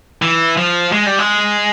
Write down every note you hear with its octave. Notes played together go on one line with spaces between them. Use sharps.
E3
F3
G#3
G3
G#3